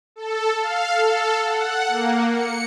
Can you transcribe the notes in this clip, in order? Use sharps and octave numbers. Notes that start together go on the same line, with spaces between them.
A4
F5
A4
F#5
A#3
C#7